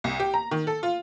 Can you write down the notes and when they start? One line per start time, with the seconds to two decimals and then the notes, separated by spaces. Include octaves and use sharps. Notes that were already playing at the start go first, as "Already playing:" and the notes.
0.04 C2
0.20 G4
0.34 A#5
0.51 D#3
0.67 A4
0.83 F4